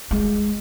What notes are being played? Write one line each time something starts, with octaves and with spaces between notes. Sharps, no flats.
G#3